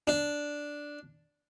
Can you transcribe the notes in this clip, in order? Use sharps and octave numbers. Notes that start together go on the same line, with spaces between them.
D4